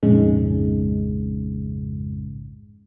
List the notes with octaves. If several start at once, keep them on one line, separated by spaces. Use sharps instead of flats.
A#1 F2 G#2 C#3 G#3